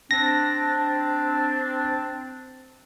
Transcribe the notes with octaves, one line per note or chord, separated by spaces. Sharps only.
C4 D4 A#6